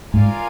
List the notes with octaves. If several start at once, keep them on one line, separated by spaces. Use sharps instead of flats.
G#2 F4 A#4 D5 F5 G#5